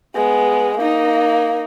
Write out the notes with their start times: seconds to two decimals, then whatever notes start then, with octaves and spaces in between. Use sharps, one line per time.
0.15 G#3 B3
0.77 A#3 D#4